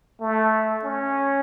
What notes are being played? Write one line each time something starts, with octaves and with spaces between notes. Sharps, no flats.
A3
C#4